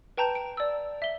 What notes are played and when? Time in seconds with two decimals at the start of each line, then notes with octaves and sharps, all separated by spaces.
0.17 B4 G5 A5 A#5 G6
0.35 D7
0.57 D5 E6
1.02 E5 G7